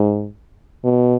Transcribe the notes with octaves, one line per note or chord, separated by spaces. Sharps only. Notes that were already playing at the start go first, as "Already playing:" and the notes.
Already playing: G#2
B2